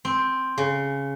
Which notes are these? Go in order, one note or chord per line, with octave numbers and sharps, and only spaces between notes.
C4
C#3